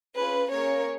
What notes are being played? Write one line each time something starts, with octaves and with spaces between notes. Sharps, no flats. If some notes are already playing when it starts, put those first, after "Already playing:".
C#4 F4 G#4 B4
A#3 C#4 G#4 A#4 C#5